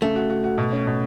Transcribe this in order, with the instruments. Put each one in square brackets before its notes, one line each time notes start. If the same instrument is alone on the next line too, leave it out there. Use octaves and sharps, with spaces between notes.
[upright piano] C#3 [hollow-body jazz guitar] A3
[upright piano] F#4
F#4
F#4
B2
C#4
B2